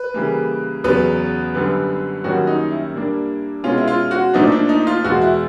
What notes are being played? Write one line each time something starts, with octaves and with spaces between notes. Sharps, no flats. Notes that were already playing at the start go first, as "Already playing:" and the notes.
Already playing: B4
C#3 E3 G3 A#3
E2 C#3 F#3 B3 B4
F#2 D3 G3 B3
F#2 D#3 G3 A#3 C#4 F#4
D#4
E4
A#2 G3 A#3 D4
B2 G#3 C#4 F4
E4
F4
F#4
A#2 F3 A3 D4 D#4
D4
D#4
F4
E2 B2 G#3 B3 F#4
E4